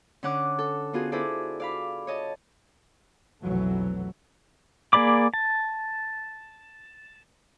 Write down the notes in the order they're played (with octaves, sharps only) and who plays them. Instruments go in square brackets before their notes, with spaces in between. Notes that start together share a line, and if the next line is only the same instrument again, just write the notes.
[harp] D3 C#4 F#5 D6 F#6
A4
B3 F4 F#4 G#4
E4 F#4 G#4 A4 C5 D5
D5 F5 B5
C#5 D#5 A5
[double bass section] F1 B1 E3 F#3 A3
[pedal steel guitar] A#3 G#4 D5 B5 D6
A5